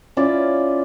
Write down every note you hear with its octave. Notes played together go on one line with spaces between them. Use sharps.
C#4 E4 F4 D5